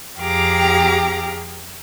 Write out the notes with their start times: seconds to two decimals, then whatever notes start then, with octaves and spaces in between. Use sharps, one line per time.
0.19 F2 G4 G#4 F5 A#5 D6